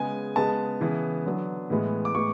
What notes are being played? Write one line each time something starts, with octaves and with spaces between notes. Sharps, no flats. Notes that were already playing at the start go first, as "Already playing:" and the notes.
Already playing: C#3 G#3 B3 G#5
C#3 G#3 B3 A5
C#3 E3 B3
D3 F#3 B3
A2 E3 G#3 B3
D6
A2 G#3 B3 C#6